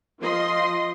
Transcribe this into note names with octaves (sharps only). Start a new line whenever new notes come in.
F3 D#5 C6